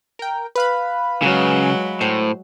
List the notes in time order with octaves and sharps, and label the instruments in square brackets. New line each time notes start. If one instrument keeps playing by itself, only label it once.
[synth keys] A#4 G5
B4 F5 B5
[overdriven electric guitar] C#3 [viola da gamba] F#3 G#3
[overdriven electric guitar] A2 [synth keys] C5